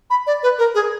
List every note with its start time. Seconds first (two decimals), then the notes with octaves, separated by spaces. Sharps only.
0.10 B5
0.27 D5
0.43 B4
0.58 A#4
0.75 G#4